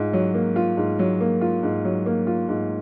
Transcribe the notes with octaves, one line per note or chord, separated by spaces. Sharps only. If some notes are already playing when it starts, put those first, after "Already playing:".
Already playing: G#2 F4
F#3
A#3
F4
G#2
F#3
A#3
F4
G#2
F#3
A#3
F4
G#2